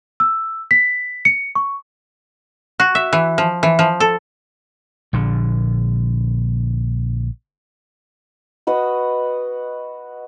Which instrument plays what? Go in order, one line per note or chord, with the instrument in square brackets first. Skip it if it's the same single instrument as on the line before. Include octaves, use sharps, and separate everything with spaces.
[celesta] E6
B6
C#7
C#6
[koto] F#4
E5
E3
F3
E3
F3
A4
[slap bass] A#1 D3
[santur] F#4 B4 D#5